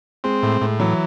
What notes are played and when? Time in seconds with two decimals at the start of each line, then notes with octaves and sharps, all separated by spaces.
0.24 G#3 C4
0.43 A2
0.61 A2
0.80 E3 F#3